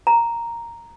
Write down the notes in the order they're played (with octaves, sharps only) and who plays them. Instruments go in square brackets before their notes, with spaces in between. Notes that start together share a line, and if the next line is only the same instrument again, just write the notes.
[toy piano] A#5